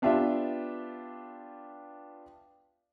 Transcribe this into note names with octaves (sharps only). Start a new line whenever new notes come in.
B3 D4 F4 G4 E5